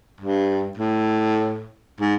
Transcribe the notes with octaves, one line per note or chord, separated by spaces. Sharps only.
G2
A2
G#2